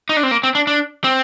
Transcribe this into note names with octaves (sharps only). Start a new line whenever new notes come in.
D#4
D4
C4
A#3
C4
D4
D4
C4